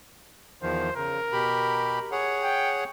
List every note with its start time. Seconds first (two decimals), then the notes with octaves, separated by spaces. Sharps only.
0.63 E2 D#3 F3 C5
0.96 C#3 A#4
1.32 B2 G4 B5
2.12 G#4 C#5 F#5
2.43 G5